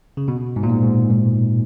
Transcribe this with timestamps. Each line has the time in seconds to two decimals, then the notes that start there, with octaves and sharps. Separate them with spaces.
0.17 C#3
0.28 B2
0.56 G#2
0.63 A#2
0.70 G#2
0.82 G#2
1.10 G#2